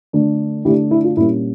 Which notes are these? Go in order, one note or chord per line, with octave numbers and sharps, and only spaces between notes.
D3 A3 D4
D3 A3 D4 E4 G4
E4
F4
A#2 G3 A#3 C#4 E4